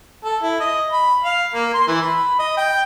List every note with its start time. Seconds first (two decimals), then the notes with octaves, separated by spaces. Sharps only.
0.25 A4
0.42 E4
0.60 D#5
0.92 B5
1.24 F5
1.54 A#3
1.74 C6
1.87 E3
2.01 B5
2.39 D#5
2.57 G5